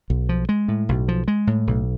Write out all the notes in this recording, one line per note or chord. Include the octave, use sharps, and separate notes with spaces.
B1
F3
G#3
A2
B1
F3
G#3
A2
B1